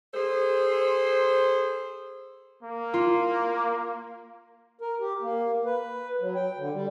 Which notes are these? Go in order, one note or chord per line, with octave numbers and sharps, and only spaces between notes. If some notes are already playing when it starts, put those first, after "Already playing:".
G#4 A4 C5
A#3
F4
A#4
G4
A#3
B4
F#3
G5
D3
G3